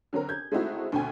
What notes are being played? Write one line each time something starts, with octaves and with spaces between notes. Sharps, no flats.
D3 F#3 C4 A#4
G6 G#6
G#3 A3 C4 D#4 E4 F#4
D2 B2 D3 C4 G5 G#5